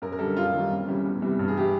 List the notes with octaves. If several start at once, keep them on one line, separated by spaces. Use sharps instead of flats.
F#2 A#4
A#4
D3 G3 A4
F#2 F4
D#3 G3
F2
C#3 E3 G3
E2
C3 E3 G3
G2
G#4
E3 G3 G4